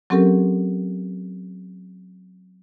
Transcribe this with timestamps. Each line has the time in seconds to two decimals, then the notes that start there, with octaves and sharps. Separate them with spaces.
0.10 F#3 C4 C#4 G4 A4 A#4